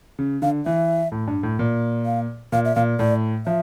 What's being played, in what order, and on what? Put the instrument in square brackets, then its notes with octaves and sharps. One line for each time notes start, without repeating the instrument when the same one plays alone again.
[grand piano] C#3
[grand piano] D3 [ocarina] F5
[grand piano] E3 [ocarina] E5
[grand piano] A2
G2
A2
A#2
[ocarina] F5
[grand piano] A#2 [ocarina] F5
[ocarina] E5
[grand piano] A#2 [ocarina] F5
[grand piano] A2 [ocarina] D5
[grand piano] F3 [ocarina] E5